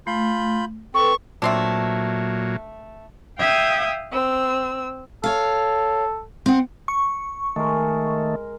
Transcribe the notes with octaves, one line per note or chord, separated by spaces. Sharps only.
A3 F4 B5 G6
C4 A4 B4 C#6
A#2 F#3 A3 C4 D4
E5 F5 G5 D#6 G6 G#6
C4 E6
A4 C#5 F5
C4 F#5
C#6
D#3 G#3 A3 A#4